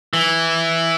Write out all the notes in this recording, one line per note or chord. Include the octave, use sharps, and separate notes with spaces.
E3